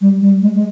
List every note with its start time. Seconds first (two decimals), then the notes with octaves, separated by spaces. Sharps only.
0.01 G3
0.22 G3
0.42 G#3
0.55 G#3